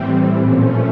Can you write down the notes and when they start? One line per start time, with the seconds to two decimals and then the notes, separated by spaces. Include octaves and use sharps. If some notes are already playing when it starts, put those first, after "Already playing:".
Already playing: A2 E3 G3 C4
0.39 A#2 F3 A3 C#4